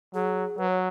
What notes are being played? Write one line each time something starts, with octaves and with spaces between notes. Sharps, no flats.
F#3 G#4
F#3 B4
C#5